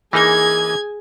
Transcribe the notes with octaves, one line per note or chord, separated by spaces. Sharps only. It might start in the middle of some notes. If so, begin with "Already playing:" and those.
E3 A#3 D#4 G#4 G#5 G#6